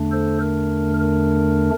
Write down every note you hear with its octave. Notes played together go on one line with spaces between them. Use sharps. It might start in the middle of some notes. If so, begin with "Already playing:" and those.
Already playing: E2 D3 A3 D4
A4 C5
A#4
A#4